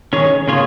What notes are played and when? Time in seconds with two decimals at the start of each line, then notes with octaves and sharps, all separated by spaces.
0.13 D#3 C#4 G#4 C#5
0.48 C#3 A#3 F4 G#4 C#5